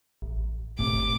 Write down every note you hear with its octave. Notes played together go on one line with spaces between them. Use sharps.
A1
G1 A2 C3 D6